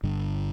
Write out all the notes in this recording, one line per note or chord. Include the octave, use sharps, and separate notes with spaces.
G1 G2 D3